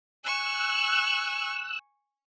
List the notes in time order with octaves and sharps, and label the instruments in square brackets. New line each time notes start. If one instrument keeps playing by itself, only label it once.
[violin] G#5 C#6 [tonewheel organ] E6 F#6